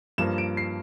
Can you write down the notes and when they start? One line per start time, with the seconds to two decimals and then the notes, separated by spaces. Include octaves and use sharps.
0.18 G2 F3 A#3 E7
0.38 D7
0.57 C7